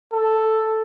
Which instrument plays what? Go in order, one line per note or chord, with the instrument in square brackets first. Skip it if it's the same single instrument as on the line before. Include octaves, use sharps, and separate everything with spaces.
[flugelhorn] A4